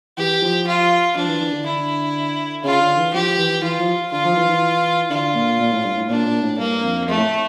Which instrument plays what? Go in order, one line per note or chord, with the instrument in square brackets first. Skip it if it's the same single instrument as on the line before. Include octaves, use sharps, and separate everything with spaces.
[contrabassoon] E3 [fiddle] G4
[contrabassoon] F3
[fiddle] F4
[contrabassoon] F3 [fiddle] D4
[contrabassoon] E3
E3
D3
[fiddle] E4
[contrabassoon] C#3 [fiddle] F4
[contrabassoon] D3
E3
[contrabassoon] F3 [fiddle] G4
[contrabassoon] E3
[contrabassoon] E3 [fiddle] F4
[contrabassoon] F3
[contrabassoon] D3 [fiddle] F4
[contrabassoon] F3
E3
E3
[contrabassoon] D3 [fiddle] F4
[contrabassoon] A#2
A#2
A2
G2
A2
[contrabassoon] A#2 [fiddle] D4
[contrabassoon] A#2
A2
[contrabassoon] G2 [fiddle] A#3
[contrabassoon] F2
[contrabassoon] F2 [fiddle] A3
[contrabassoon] A2